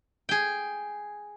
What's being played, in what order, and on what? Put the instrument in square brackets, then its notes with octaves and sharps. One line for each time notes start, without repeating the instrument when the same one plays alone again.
[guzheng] G#4 G5